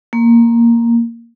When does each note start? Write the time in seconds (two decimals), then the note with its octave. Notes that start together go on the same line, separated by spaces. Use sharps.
0.13 A#3